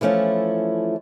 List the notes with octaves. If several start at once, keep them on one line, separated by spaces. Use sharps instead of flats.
E3 F3 A3 C#4 E4